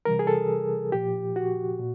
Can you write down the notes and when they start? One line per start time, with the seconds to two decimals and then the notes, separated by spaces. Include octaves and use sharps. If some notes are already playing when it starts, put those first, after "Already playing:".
0.05 C3 E3 G3 A#4
0.19 G#4
0.27 A4
0.92 A#2 F3 G4
1.36 F#4
1.79 A#2